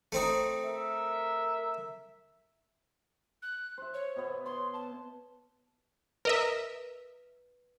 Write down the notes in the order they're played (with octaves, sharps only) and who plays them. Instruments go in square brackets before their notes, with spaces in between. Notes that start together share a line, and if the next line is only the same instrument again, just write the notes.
[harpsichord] A3 C4 D#4
[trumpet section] A#4 E5
[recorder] F#6
[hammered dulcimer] C5 E5
[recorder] C#5
[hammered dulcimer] B2 B3
[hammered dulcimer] C#5 [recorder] C6
[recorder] A5
[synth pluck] A#4 D#5 E5 [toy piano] B4